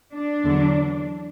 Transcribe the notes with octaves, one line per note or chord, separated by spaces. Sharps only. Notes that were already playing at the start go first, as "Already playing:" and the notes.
D4
E2 D3 F#3